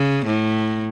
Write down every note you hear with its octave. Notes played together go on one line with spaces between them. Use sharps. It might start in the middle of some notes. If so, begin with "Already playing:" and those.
Already playing: C#3
A2